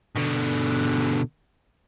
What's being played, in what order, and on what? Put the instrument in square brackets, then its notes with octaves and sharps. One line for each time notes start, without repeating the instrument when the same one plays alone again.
[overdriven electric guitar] B2 D3